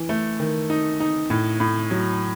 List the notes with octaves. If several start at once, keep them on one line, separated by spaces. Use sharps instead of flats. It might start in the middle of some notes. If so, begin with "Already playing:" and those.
Already playing: E3
A3
D#3
D#4
D#4
A2
A2
F#3